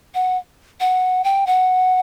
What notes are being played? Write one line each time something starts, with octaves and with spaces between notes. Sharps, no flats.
F#5
F#5
G5
F#5